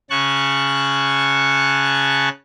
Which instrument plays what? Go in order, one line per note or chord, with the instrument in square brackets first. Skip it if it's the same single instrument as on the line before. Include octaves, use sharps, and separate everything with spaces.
[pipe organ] C#3 C#4 A5 C#6 F#6